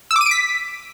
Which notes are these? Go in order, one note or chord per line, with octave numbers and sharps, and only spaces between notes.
E6
D6
D#7
D7
B6